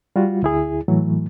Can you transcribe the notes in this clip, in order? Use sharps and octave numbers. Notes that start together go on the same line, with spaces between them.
G3 F4 F#4
D2 E4 G#4
A2 E3 F#3 A3